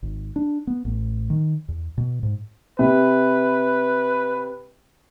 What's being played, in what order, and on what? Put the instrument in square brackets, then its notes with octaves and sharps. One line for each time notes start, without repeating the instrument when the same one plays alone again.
[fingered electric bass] G#1
D4
B3
A1
D#3
E2
B2
G#2
[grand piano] C3 [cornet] B4